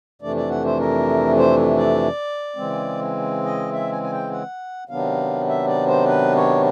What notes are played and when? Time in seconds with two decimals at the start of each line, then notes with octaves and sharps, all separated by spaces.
0.21 F2 C3 E3 A3 D4 D5
0.36 D5
0.50 F#5
0.65 C5
0.79 A#4
1.38 C5
1.77 D5
2.56 C#3 E3 G#3 C4
3.44 D#5
3.73 E5
3.91 G#5
4.03 G#5
4.12 G5
4.31 F#5
4.89 C3 D#3 F#3 B3 D4 F5
5.48 E5
5.67 D5
5.87 C5
6.07 B4
6.35 C#5